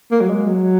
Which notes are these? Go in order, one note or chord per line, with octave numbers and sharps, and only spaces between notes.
A#3
F#3
G#3
F#3